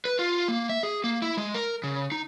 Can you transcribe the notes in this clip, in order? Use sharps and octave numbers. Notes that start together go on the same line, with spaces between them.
B4
F4
A#3
E5
G#4
A#3
E4
G#3
A#4
C#3
D#4